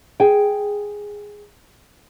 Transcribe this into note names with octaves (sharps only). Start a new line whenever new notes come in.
G#4 G5